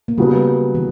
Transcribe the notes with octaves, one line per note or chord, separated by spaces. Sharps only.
A#3
C#3 F#3 G3 B3
E3